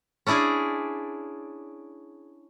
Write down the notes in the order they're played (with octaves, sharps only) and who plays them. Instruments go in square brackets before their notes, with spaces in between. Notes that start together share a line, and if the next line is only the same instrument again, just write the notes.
[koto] C#4 D4 E4 G#4 D5